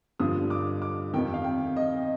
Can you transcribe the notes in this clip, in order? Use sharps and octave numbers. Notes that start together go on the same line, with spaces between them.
G2 D3 F3 D#6
D6
D6
F2 C3 D#3 G5
F5
G5
D#5